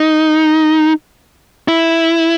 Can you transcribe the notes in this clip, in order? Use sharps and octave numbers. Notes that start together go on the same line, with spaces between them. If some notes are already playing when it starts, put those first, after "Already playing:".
Already playing: D#4
E4